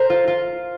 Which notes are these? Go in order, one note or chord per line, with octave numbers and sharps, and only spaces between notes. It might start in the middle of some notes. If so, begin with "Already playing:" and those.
Already playing: A#4 C5
F4
F4